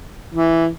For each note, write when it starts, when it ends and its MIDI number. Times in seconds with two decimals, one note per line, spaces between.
0.34 0.67 52